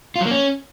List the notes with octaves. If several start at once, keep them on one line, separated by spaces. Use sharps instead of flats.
F4
F#3
A#3
C#4